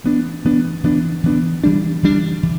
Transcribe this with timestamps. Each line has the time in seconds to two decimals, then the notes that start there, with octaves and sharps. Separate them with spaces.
0.04 E3 B3 D4
0.45 E3 B3 D4
0.84 E3 B3 D4
1.24 E3 B3 D4
1.64 E3 G3 D4
2.03 E3 G3 D4
2.43 E3